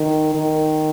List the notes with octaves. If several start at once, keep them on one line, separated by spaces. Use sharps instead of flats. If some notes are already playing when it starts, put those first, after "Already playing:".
Already playing: D#3
D#3